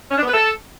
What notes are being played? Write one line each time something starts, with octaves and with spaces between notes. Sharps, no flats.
C#4
D4
B3
B4
A4